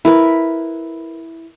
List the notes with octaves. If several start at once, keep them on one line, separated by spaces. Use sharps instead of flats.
E4 A#4 B4